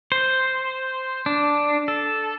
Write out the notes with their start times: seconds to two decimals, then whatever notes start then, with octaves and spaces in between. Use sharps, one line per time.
0.12 C5
1.26 D4
1.88 A4